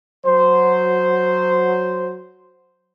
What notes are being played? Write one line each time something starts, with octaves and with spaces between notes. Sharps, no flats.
F#3 C5